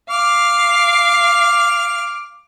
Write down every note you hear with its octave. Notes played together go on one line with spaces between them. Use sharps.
F5 D6 F6